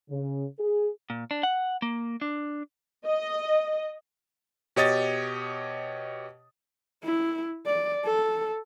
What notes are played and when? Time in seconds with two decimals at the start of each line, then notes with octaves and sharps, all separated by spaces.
0.10 C#3
0.59 G#4
1.10 A#2
1.31 D4
1.43 F#5
1.82 A#3
2.21 D4
3.06 D#5
4.76 B2 G4 C#5 D#5 D#6 A6
7.04 E4
7.66 D5
8.05 A4